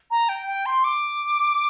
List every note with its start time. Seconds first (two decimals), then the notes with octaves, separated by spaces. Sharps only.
0.11 A#5
0.29 G5
0.47 G5
0.66 C6
0.84 D6